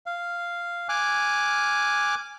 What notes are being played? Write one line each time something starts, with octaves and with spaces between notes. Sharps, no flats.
F5
G#5 D6 F6 F#6